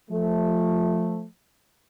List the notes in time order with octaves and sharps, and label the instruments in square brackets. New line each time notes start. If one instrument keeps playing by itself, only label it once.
[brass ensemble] F3 A3